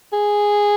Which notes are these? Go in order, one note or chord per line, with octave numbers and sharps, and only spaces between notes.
G#4